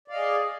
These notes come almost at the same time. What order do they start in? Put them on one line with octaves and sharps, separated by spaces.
D5 F5 D#5 G#4